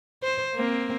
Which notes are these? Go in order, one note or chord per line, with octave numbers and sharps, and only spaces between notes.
C5
A#3 C4